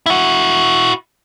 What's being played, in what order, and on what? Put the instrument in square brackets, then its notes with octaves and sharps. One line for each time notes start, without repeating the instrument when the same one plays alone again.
[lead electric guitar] E4 F#4